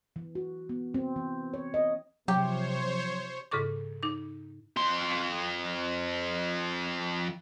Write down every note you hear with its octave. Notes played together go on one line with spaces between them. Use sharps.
E3
F#4
B3
C4
E3
C#5
D#5
C3 F3 F#3 G4 C5 C#5
G#2 C#3 A4 C#6 D6
D#4 D6
F2 C6